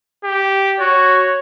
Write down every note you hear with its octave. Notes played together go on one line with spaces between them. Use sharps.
G4
F#4 C#5